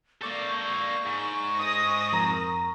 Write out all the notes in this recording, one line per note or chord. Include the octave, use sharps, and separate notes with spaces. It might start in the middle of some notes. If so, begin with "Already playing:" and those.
A#3 A4 D5 C#6 G6
G#2
D#6 A#6
F2 A#4 A#5